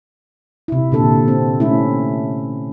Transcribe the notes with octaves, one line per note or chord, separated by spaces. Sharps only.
C3 E4
A#2 D3 A4
C4
A3 C#4 E4